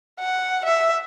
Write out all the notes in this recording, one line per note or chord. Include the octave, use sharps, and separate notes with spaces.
F#5
E5